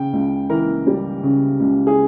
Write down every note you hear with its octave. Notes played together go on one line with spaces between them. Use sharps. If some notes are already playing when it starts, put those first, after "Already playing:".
Already playing: C#3 G5
C#2
E3 A#4
G3
C#3
C#2
G#4